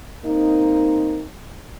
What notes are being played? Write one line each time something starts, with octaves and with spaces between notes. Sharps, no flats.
A#3 C4 D#4